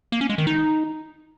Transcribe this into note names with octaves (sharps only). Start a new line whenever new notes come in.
A#3
C#4
G#3
D#3
D#4